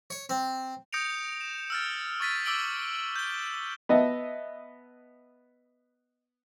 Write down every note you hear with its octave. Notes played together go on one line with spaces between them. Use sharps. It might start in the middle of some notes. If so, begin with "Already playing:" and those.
C#5
C4
D#6 G6 A#6 C#7 D7 F7
E7
E6 F6 A6
C#6 D#6 A6 B6 D#7
D6 E6 A6 D7 F#7 G7
G6 G7
B3 D#5 E5 A5